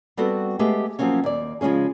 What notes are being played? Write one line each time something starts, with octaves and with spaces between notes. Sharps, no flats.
G3 B3 C4 F#4 A4
G#3 A3 B3 G4 G#4
F3 F#3 A#3 C4 C#4
D#2 D5
C#3 F3 G#3 C#4 G#4